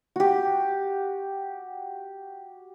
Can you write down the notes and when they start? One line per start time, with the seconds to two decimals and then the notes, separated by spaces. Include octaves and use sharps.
0.16 F#4 G4